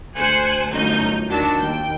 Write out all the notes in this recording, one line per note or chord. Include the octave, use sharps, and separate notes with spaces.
D2 C5 G#5 F#6 C#7
G1 F#2 A3 D#4 G6
D#2 D#3 D4 F#4 A5 E6
D#2 G5